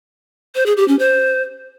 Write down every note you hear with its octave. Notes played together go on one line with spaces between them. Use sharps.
C5
G#4
G4
C#4
C5